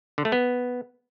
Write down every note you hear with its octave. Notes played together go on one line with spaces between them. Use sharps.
D3
A3
B3